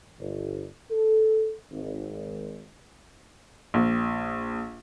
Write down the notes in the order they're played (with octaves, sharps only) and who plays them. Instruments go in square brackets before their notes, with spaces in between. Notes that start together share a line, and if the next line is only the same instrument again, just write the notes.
[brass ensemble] G1
A4
G#1
[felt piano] A#1